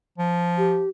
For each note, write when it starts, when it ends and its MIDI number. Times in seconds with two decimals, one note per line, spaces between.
0.18 0.84 53
0.58 0.89 67